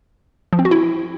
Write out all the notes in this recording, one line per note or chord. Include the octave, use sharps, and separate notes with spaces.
F3
C4
F#4
E4